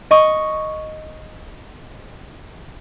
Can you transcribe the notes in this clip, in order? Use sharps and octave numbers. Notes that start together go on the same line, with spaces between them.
D#5 C#6